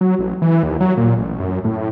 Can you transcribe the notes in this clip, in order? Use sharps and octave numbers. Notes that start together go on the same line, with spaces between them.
F#3
A1
E3
D#2
F#3
A#2
A1
F#2
A2